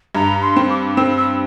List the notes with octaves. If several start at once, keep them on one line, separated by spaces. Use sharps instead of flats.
G2 A#5
C6
C4
D6
C4 E6
E6